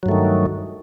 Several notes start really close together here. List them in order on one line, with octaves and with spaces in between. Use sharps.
F#3 G2 A3 D#3